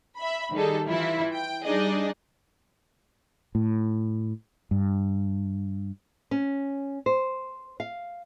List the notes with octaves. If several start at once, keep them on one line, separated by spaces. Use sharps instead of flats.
E5 B5
D#3 G3 D#4 G#4 A4
E3 E4 F4
G5
G3 D4 D#4 G#4 D5 D#5
A2
G2
C#4
C5
F5